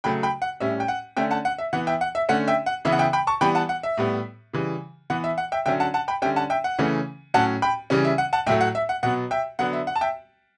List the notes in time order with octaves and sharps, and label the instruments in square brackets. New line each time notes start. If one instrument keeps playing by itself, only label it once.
[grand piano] C#3 F#3 A3 G5 B5
G5 B5
F#5
A2 G3 C#4 E5
G5
F#5
D3 A3 C#4 E5 G5
F#5 A5
F#5
E5
E3 B3 F#5
E5 G5
F#5
E5
D3 A3 C#4 F#5
E5 G5
F#5
C#3 E3 B3 E5
F#5
E5 G5
G5 B5
A5 C#6
E3 G3 B3 G5 B5
F#5 A5
F#5
E5
A2 G3 B3
C#3 E3 G3
E3 B3 F#5
E5
F#5
E5 G5
D3 F#3 C#4 E5 G5
F#5 A5
F#5 A5
G5 B5
D3 G3 C#4 E5 G5
F#5 A5
E5 G5
F#5
C#3 E3 A3 C#4
A2 F#3 C#4 F#5 A5
G5 B5
C#3 E3 G3 C#4
E5
F#5
F#5 A5
A2 F#3 A3 E5 G5
F#5
E5
F#5
B2 F#3 B3 F#5
E5 G5
D3 F#3 B3 F#5
E5
F#5
A5
E5 G5